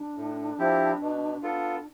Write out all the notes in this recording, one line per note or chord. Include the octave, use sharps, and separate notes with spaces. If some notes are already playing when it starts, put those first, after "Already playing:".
Already playing: D4
A2
F3 C4 E4 G4
B2
B3 F4 A4